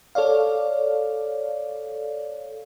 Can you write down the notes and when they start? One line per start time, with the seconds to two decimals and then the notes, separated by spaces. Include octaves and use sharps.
0.15 A4 C#5 D5 F5